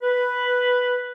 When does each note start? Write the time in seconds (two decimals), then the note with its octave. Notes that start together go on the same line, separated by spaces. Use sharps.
0.02 B4